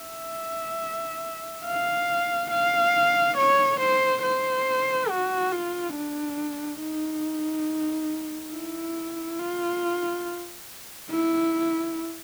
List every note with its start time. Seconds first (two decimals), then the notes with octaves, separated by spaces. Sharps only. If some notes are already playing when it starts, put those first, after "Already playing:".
Already playing: E5
1.65 F5
2.51 F5
3.38 C#5
3.80 C5
4.23 C5
5.09 F#4
5.52 F4
5.95 D4
6.81 D#4
8.53 E4
9.39 F4
11.10 E4